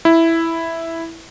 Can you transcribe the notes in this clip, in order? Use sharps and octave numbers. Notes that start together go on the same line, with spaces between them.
E4